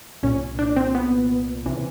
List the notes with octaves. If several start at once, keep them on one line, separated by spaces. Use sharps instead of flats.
C2 A#2 C#4
D4
C4
B3
C#2 C3 E3